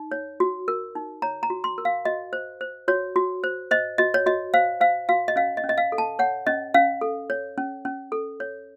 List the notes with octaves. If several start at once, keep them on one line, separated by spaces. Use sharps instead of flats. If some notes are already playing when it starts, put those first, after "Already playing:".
Already playing: D#4
C#5
F#4
A#4
D#4
C#5 A#5
A#5
F#4
C6
A#4
F5
F#4 D#5
C5
C5
F#4 C#5
F#4
C5
C5 D#5
F#4 D#5
C#5
F#4 D#5
C5 F5
C5 F5
F#4 F5
D#5
C#4 F5
D#5
C#4
D#5
F5
A4
A5
C#5 F#5
C#4 D#5
C#4 F5
A4
C#5
C#4
C#4
A4
C#5